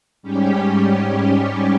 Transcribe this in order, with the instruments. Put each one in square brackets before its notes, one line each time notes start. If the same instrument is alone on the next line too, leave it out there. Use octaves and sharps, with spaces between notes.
[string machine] G#2 G3 C#4 G4